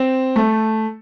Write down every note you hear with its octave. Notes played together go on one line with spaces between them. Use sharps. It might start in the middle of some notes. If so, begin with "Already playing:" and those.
Already playing: C4
A3